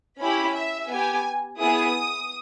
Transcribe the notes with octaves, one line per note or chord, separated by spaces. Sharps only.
C#4 E4 G4 B5
E5
B3 G4 G#5
B3 E4 G#4 D#6